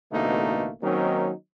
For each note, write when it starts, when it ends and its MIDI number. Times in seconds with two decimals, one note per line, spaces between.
0.12 0.70 33
0.12 0.70 47
0.12 0.70 50
0.12 0.70 57
0.12 0.70 58
0.12 0.70 63
0.82 1.32 51
0.82 1.32 54
0.82 1.32 58
0.82 1.32 60
0.82 1.32 61
0.82 1.32 63